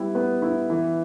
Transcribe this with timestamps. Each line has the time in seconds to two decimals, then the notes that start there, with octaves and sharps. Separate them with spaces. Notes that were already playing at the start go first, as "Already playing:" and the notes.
Already playing: G3 B3 E4
0.15 B3
0.42 E4
0.70 E3